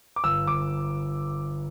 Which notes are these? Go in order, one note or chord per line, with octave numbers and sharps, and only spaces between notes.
D6
G1 E6
G1 D6